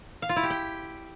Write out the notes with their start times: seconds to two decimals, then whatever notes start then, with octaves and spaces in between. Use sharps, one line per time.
0.22 F5
0.29 F4
0.36 E4
0.43 G4
0.50 G5